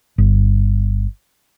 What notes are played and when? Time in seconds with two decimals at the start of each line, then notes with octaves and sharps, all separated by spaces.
0.18 G1